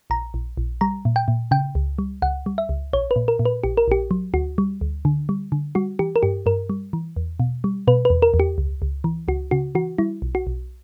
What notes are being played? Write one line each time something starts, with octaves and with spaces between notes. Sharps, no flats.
A#1 A#5
A#1
A#1
G3 A#5
A#2
G5
A#2
C#3 G5
C#2
G3
C#2 F#5
G3
E5
C#2
A#1 C#5
B4
A#2
A#4
A#2
B4
A#1 G4
A#4
A#1 G4
F#3
D2 F#4
G3
D2
D3
G3
D3
G3 F#4
E3 G4
A#4
G2 G4
G2 A#4
G3
E3
E2
B2
G3
B2 B4
B4
E2
A#4
E2
G4
C#2
C#2
E3
C#2 F#4
C#3 F#4
E3 F#4
G3 E4
B1
F#4
B1